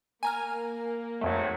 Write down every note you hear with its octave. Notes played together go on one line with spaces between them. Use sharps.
A#3 G#5 A#5 F6
G#1 F2 F#3 A3